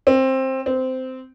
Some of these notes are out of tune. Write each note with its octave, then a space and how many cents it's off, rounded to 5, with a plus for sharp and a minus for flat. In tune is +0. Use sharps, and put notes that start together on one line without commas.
C4 +15
C4 -15